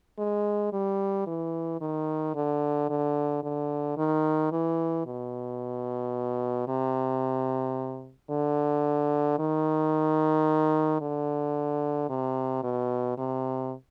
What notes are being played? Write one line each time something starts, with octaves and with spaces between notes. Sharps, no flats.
G#3
G3
E3
D#3
D3
D3
D3
D#3
E3
B2
C3
D3
D#3
D3
C3
B2
C3